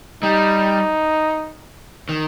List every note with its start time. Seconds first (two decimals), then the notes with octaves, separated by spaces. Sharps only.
0.23 G3 D#4
2.09 D#3